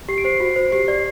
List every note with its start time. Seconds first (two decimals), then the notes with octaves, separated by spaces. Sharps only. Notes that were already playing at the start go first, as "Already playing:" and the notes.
0.09 G4 C7
0.18 D7
0.25 C5 C7
0.40 F#4
0.56 C5
0.72 G4 C7
0.88 D5